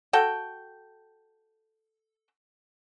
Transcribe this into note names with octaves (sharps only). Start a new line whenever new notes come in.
F#4 A4 G5